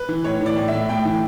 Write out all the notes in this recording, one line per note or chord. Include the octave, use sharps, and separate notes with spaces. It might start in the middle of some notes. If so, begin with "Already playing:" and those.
Already playing: B4
E3
A2 C#5
E3
D5
A2
E5
A2
A2 G5
E3